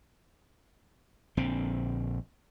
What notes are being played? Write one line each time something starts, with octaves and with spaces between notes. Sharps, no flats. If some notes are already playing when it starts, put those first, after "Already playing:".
A#1 D3 C4